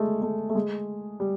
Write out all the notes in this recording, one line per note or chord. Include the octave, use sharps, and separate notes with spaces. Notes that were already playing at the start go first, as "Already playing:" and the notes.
Already playing: G#3 A3
A3
A3
G#3
G3